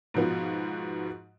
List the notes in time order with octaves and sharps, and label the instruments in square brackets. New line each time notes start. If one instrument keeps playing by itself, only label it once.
[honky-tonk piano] G#2 B2 F3 B3